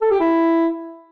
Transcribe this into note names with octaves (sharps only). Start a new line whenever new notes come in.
A4
G4
E4